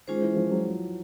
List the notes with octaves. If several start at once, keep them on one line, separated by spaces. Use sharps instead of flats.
D#3 G#3 C#4 F4 G#4 C5
E3
F3
F#3